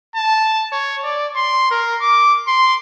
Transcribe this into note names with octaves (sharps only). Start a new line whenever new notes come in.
A5
C#5
D5
C6
A#4
D6
C6